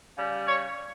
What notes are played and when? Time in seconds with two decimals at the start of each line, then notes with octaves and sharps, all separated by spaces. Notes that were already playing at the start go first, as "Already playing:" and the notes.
0.14 C#3 G3
0.46 C#5